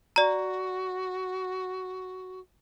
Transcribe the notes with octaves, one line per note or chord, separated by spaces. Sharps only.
F#4 D5 A#5